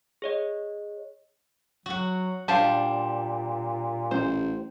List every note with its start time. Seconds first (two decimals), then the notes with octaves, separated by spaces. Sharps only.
0.22 G#4 C#5 D#5
1.86 F#3 F#4 F#5
2.48 A#2 G3 D4 C5 F5 A5
4.11 A1 C5